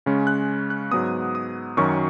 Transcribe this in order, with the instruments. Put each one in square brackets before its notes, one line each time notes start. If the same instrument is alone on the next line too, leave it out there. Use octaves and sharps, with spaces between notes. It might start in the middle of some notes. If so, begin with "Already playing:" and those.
[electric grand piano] C#3 G#3 C#4
F#6
F#6
G#2 F#3 B3 D#6
D#6
F#2 D#3 F#3 C#4 C#6